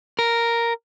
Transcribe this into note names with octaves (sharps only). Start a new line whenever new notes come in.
A#4